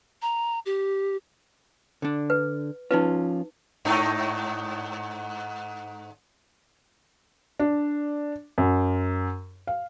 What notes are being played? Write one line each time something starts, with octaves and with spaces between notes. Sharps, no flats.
A#5
G4
D3 D4
B4
F3 C#4 D#4 F4 B4
G#2 A3 D#4
D4
F#2
F5